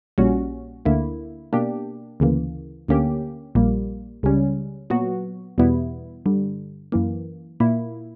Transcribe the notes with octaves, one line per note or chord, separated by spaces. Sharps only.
A#1 A#2 G3 C#4 F#4
D2 D3 A#3 E4
B2 A#3 D4 G4
D2 C#3 E3 A#3
D2 D3 A#3 C#4 G4
A#1 A#2 G3 A#3
C#2 C#3 G3 C#4
A#2 F#3 B3 F#4
E2 B2 G3 B3 E4
G2 D3 G3
F#2 E3 A#3
A#2 A#3 E4